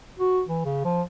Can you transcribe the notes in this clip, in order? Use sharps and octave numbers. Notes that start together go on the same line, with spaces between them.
F#4
E3
C#3
F3